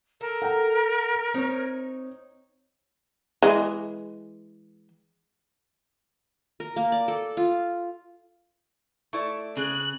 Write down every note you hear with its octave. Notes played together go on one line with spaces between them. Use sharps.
A4 A#4
F#5 G5 A#5
C4 D#4 C#5
E3 G#3
A#4
A#3
D5
A4
F4
A3 E4 D5 C#6
C#3 G#4 F#6